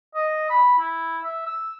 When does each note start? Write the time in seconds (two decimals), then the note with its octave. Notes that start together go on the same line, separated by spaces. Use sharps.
0.15 D#5
0.50 B5
0.79 E4
1.24 E5
1.46 E6